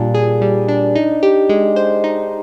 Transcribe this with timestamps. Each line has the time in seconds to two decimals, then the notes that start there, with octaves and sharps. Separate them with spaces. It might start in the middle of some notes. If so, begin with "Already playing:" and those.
Already playing: A#2 G3 D4
0.15 G#4
0.42 G3
0.68 D4
0.96 D#4
1.23 G4
1.49 G#3
1.76 C5
2.04 D#4